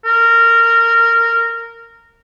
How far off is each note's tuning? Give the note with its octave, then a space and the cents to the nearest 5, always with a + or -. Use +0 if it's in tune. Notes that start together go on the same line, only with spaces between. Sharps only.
A#4 -15